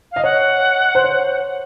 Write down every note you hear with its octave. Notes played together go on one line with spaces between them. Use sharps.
D#5 F5
C#5 F#5
C5
C#5